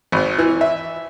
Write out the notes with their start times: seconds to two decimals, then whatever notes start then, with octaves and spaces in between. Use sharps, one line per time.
0.12 G#1
0.38 E3
0.61 E5